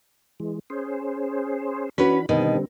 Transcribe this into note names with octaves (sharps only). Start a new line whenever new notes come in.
E3 G#3
C#4 G#4 C5
E3 C#4 D4 F#4 B4 B5
B2 D3 D#3 G3 C4